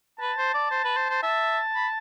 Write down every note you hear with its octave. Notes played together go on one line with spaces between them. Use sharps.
B4 A5
C5
D5
C5
B4
C5
C5
E5 A5
B5